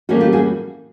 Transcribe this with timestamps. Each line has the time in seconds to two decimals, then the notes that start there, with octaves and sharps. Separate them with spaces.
0.09 A2 E3 G3 A#3 C#4 F#4 G#4
0.20 F4 G4
0.33 F#4 G#4